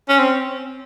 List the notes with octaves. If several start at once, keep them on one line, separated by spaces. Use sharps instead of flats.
C#4
C4